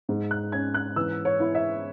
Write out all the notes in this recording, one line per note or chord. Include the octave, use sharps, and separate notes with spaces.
G#2
F#6
C#4 G#6
F#6
E3 E6
C#5
E4
E5